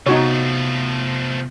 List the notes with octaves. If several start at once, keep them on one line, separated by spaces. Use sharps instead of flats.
C3 F3 A3 B3 D#4 F#4 C#5